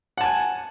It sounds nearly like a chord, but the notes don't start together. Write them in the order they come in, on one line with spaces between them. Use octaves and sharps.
F#5 A5 G#5